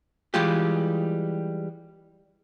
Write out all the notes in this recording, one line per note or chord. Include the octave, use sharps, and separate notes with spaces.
E3 G3 G#3 F4 G4